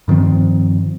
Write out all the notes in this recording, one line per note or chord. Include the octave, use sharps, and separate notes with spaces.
G2 D#3 F3 C4